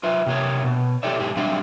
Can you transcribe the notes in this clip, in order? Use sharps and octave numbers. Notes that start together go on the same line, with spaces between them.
F4 B4 E5
C3 A#3 C#5
B2
E4 G4 A4 C#5 D5 E5
G#2 G4 G#4
F#3 G3 C4 D4 E5 F5